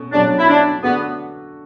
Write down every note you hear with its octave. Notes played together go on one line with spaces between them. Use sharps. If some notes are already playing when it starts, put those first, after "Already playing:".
Already playing: B2 A3 C#4
B2 F#3 A3 C#4 D4
E4
D4
D3 A3 B3 D4 F#4 A4